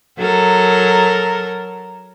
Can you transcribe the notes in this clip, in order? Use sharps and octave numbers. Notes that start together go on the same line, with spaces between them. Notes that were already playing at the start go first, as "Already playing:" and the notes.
F#3 A4 A#4